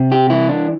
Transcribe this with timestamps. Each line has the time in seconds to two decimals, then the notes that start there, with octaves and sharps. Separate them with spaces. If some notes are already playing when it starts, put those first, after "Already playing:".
Already playing: C3
0.12 G4
0.30 E3 E4
0.49 D4